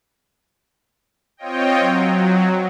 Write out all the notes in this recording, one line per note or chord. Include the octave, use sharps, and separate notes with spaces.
C4 F4 C#5 D#5 G5
F#3